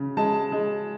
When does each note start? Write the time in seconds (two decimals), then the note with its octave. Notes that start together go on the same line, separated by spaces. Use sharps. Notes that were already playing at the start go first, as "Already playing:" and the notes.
Already playing: C#3
0.17 G#3 A5
0.52 G#3